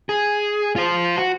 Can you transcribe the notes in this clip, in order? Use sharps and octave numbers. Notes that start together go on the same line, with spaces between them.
G#4
F4 C5
F#4